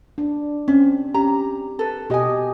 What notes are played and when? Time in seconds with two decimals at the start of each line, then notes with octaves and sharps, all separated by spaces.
0.18 D4
0.68 C4 C#4
1.14 C#4 G4 A#5
1.79 A4 B4
2.10 B2 F#4 G4 D#5 G#5